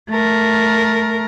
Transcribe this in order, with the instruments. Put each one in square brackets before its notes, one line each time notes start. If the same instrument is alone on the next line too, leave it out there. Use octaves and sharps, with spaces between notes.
[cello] A3 A#4